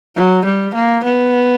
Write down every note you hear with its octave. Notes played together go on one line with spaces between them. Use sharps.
F#3
G3
A#3
B3